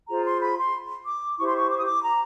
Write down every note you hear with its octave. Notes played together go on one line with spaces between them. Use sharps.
F4 G#4 C5 A#5
C6
B5
C6
D6
E4 G4 C5 C#6
C6
C#6
D6
D#6
D6
A#5